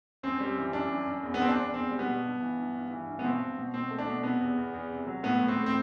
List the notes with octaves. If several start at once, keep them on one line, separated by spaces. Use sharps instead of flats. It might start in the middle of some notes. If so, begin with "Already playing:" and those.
F#2 C4
G3
E3
F#2 D4
F#2
F#2
E2
B3
E2 C4
D4
E2
E2 C4
G3
B3
B2
G2
E3
G2
G2
E3
G2
B3
B2 C4
B2
B2
B2 C4
A3
D4
B2
C3 B3
E2
E2
E2
C3
F#3
A2 B3
A2
C4
A2
C4